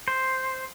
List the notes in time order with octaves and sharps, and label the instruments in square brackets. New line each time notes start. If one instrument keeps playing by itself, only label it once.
[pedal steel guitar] C5